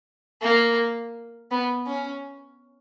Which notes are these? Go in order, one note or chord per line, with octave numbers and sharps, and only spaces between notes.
A#3
B3
C#4